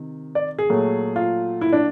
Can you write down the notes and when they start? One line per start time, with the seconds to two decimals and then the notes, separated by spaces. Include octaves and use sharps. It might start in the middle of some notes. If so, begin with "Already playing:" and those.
Already playing: C3 D#3
0.35 D5
0.59 G#4
0.70 A#2 F#3 A3
1.16 F4
1.61 E4
1.73 D4